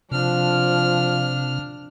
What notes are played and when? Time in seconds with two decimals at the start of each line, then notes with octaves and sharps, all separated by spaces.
0.11 C3 F3 D4 F6